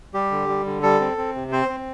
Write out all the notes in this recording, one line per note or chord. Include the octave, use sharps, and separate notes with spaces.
G3 G4
D3
G3
D3
G3 A4
C4
C4
C3
C4 C5
C4